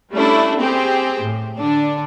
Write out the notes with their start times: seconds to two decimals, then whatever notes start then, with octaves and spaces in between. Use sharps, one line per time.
0.12 G3 A3 C#4 D4 E4
0.59 C4 G4 G#4 C5
1.23 A2
1.59 D3 D4